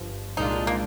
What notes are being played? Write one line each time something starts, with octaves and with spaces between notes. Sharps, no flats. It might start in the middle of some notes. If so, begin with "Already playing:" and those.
Already playing: G1 G2 F3
C2 A#2 G#3 D4 D#4 F4
A#3